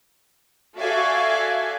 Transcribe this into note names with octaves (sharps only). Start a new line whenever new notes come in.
F#4 A4 D5 E5 F5 G#5